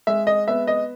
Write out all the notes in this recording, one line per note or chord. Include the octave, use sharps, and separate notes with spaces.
G#3 E5
D#5
B3 E5
D#5